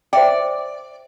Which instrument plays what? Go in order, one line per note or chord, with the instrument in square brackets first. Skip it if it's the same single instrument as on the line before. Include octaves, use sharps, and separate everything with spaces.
[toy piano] C5 E5 G5 [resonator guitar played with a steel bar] D5